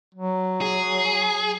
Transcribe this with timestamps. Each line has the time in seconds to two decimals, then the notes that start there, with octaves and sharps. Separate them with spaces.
0.15 F#3
0.61 G#4